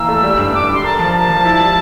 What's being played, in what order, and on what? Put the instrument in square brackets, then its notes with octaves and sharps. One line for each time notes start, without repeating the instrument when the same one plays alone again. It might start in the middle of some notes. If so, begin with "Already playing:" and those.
Already playing: [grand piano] E3 A#3 [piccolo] E6
[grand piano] A3
G3
G2
[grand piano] G2 [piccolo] D6
[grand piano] G3 [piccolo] C6
[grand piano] A#4 [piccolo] A5
[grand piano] F3 [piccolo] A5
[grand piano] A#4 [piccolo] A5
[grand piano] F3
E4
G3